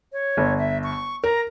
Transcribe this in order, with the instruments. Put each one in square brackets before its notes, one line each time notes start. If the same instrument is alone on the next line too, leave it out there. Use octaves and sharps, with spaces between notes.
[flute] C#5
[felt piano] G1
[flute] E5
C#6
[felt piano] A#4 [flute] A#5